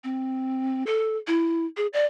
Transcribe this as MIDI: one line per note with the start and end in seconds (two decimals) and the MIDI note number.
0.04 0.84 60
0.87 1.17 69
1.27 1.66 64
1.77 1.87 68
1.93 2.06 74